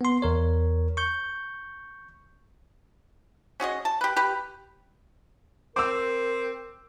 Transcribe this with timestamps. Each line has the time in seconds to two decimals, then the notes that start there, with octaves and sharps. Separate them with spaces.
0.01 B3 C6
0.22 E2 A#4 C#5
0.97 C#6 G6
3.60 C#4 F#4 G#4 D#5
3.85 A5
4.01 G4 B4
4.16 G4 B4
5.76 C4 A#4 D6 E6